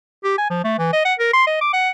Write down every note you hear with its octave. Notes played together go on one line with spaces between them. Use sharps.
G4
G#5
F3
A3
E3
D#5
F#5
A#4
C6
D#5
D6
F#5